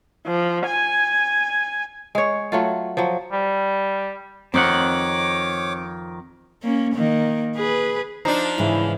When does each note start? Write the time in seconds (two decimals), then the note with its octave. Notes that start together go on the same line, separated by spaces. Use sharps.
0.27 F3
0.66 G#5
2.15 G#3 C#5
2.52 F#3 A3 F4
2.97 F3 F#3
3.32 G3
4.54 F2 D#3 C4 C#5 F#5 D6
6.63 A#3 C#4
6.94 D#3 A#3
7.56 G#4 B4
8.25 F3 D4 D#4 C5 A#5
8.58 G#2 C#3 E3 E4